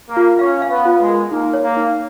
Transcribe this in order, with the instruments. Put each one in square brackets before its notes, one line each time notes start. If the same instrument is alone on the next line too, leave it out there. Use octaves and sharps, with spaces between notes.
[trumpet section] A#3
[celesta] F4
[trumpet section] C#4 [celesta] F5
[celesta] F5
[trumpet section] B3
[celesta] F4
[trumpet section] G#3
[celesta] A#4
[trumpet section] A#3 [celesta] D#4
[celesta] C#5
[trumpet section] A#3
[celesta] D#4